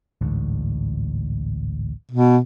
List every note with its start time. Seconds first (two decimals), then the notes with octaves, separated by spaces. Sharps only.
0.21 A1 D2 G#2
2.11 B2